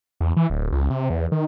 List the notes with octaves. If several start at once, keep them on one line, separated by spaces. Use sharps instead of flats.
E2
E3
D1
C#2
C3
E2
D#3